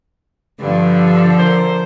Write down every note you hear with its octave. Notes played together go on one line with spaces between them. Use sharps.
G2 D3 F3
A#4 C5